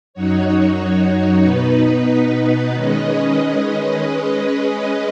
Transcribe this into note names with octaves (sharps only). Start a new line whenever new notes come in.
F#2 F#3 D#4 F#4 C#5
B2 B3 D#4 B4
D#3 G#3 C#4 B4 D#5
G#3 C#4 B4 D#5